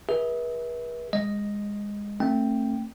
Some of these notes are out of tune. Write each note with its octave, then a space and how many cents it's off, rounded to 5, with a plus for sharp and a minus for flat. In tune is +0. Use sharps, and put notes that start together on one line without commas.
G#4 -5 B4 -40 E5 -30
G#3 -20 D#5 +0
A3 +30 C4 +45 G5 +0